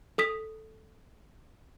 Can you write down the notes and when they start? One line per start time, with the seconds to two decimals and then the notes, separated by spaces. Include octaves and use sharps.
0.18 A4 D#6 B6